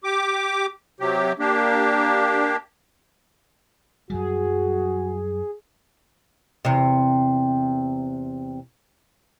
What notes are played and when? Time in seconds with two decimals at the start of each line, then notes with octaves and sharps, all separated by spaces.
0.04 G4 D6
1.00 C3 F#3 G4
1.39 A#3 D4 G4
4.10 F#2 F#3 G3 F#4 G#4
6.65 E2 C3